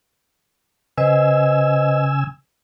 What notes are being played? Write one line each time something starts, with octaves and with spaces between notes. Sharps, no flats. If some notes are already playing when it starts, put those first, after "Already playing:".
C#3 B4 C5 D#5 G#5 E6